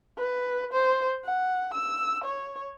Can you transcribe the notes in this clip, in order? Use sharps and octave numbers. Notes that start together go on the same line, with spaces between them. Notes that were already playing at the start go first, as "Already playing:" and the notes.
B4
C5
F#5
E6
C#5